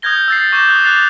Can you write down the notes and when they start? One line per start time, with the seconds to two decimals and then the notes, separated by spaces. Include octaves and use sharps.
0.02 D#6 F6 G6 G#6 A#6 G7
0.28 E6 A6 C7
0.52 C#6 D6 G6 A#6 E7
0.69 D#6 F#6
0.84 D6 F#6 G6 A6 C7 F7